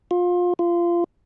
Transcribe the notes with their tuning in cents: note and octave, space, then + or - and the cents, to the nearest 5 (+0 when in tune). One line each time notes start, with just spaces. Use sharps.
F4 +25
F4 -20